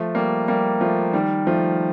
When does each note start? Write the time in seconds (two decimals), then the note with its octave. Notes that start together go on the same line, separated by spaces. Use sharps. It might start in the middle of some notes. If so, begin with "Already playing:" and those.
Already playing: F3 A3
0.15 G3 A#3
0.48 G3 A#3
0.81 F3 A3
1.13 D#3 G3
1.47 F3 A3